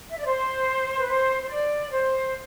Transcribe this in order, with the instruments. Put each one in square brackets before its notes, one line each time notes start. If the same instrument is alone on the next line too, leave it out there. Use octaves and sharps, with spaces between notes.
[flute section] E5
D5
C5
B4
C5
C5
D5
C5